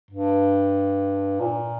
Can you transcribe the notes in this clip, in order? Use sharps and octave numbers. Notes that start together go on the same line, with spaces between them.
G2
A#2